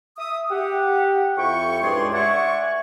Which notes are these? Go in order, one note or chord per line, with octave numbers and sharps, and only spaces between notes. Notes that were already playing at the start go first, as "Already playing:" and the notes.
E5 D#6
G4 F#5
F2 E4 G5 C#6
C#2 G2 G#3 G#4 D5 C6
D5 E5 F#5 G#5 C#6